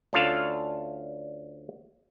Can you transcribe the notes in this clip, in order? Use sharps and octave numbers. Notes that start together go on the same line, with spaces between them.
D2 C#4 D4 F4 A4 F5